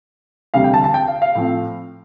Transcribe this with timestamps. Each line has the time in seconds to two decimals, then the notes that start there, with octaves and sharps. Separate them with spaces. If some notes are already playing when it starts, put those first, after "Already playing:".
0.54 E1 D2 C3 G3 F5
0.64 G5
0.74 A5
0.84 A5
0.94 G5
1.08 F5
1.22 F5
1.35 A2 F3 C4